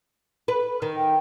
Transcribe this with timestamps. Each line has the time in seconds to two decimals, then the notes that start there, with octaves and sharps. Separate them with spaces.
0.48 B4
0.82 D#3
0.97 G5